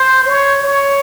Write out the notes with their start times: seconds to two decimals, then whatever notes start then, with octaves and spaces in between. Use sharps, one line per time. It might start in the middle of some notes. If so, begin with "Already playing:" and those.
Already playing: C5
0.27 C#5
0.63 C#5